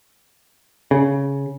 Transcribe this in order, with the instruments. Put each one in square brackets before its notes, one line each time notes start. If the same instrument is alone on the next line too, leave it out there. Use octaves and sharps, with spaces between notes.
[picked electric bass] C#3